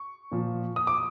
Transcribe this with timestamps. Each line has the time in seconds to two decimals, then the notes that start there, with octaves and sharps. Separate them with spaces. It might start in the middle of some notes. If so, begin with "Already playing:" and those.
Already playing: C#6
0.32 A#2 F3
0.76 D#6
0.87 D6